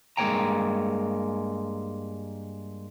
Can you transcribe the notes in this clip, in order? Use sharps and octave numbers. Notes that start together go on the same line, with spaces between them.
G2 G#3 A#3 C#5 G5 A#5